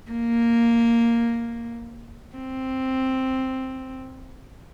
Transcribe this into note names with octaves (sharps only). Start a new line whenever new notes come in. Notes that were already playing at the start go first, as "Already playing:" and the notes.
A#3
C4